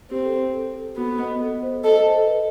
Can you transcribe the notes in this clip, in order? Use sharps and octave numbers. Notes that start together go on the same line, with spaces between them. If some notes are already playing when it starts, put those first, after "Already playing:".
C4 G4
A4
A4
A4
B3 F#4
D#5
A4
C5
A4 D#5
C5
B4